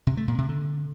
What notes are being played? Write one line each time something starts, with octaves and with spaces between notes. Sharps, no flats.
C3
A3
A#2
C3
D3